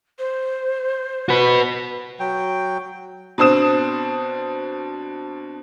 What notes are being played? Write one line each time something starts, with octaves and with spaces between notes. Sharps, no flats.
C5
F#4 B4
F#3 G5
B2 C4 D4 C5 D#6 E7